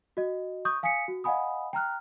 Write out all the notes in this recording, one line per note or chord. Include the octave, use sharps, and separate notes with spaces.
F#4 D#5
C#6 D#6 G6
F5 G#5 D#6 B6 C#7
F#4
D#5 F5 F#5 G#5 B5 D#6
G5 A#5 F6 F#6